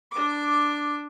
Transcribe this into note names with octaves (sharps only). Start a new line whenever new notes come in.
D4 D6